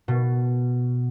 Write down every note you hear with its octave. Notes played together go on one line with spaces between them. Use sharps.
B2